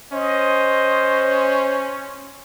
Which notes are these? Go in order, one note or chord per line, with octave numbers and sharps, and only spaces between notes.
C#4 C5 D#5